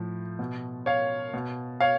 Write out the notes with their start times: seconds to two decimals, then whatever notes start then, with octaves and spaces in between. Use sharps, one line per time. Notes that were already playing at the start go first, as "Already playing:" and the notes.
Already playing: A2 F3
0.39 B2
0.86 C#5 F5
1.33 B2
1.80 C#5 F5